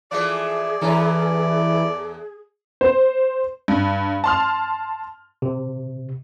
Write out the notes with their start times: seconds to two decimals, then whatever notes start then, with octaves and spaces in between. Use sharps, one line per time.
0.12 E3 F3 A3 G#4 D5
0.81 E2 E3 C#4 A4
2.81 C5
3.68 G2
4.24 A5 C6 F6
5.42 C3